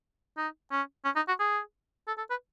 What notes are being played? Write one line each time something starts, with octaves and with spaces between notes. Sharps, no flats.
D#4
C#4
C#4
D#4
F#4
G#4
A4
A4
B4